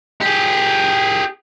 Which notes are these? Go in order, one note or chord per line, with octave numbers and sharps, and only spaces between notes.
G4 G#4